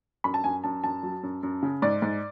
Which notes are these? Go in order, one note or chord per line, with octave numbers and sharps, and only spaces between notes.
F#2 B5
A5
F#2 G#5
F#2 A5
F#2 A5
F#3
F#2
F#2
C#3
G#2 D5
G#2